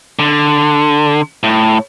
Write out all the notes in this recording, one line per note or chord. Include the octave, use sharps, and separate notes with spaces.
D3
A2